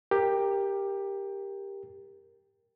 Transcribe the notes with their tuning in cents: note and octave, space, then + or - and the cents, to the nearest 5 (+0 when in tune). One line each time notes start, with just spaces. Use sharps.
G4 +10 A#4 +0